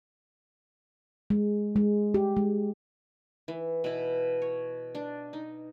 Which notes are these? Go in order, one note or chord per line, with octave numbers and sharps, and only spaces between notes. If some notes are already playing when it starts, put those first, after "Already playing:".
G#3
G#3
G4
G#3
E3
B2 E4
C#5
D4
D#4